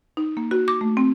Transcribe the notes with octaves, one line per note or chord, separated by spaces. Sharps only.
D#4
A#3
F#4
D6
A3
C4